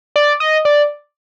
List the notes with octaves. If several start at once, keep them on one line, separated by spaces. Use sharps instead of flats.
D5
D#5
D5